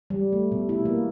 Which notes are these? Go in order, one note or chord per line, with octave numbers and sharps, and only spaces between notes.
G3
A3
B2
E4
A#3